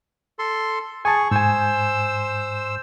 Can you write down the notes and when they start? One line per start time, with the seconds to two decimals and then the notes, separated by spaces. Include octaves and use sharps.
0.39 A4 C6
1.05 G#4 G#5 A5 C#6
1.31 G#2 C5 G#5 E6